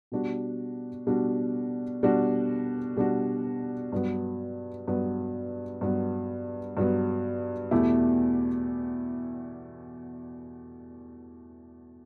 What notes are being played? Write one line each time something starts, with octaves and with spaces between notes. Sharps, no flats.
B2 G3 D4 F#4
B2 G3 D4 F#4
B2 G3 D4 F#4
B2 G3 D4 F#4
G2 F#3 B3
G2 F#3 B3
G2 F#3 B3
G2 F#3 B3
E2 B2 A3 E4 G4